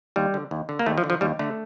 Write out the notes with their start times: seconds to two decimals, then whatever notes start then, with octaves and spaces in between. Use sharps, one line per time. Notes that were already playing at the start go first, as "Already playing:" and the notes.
0.16 D#2 G3
0.34 D3
0.51 D#2
0.69 D3
0.79 A#3
0.86 D#2 A3
0.98 F3
1.04 D3
1.10 F3
1.21 D#2 G3
1.39 D3 A3